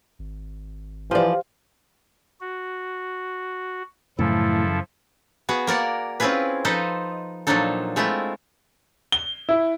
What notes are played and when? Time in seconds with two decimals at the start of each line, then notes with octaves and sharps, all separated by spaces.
0.19 G#1
1.11 E3 F3 G4 C5 D5 F5
2.41 F#4
4.19 F#2 A2 C#3 E3 F3 E4 A4
5.49 B3 F#4 G#4
5.67 A#3 A#4 D5 F#5
6.20 C4 C#4 E4 F4 G#4 B4
6.65 F3 D#4 A4 B4 C5 D#5
7.47 A#2 F3 F#3 D4 D#4 A4
7.96 G#3 A3 C4 E4 F4
9.12 G7
9.49 E4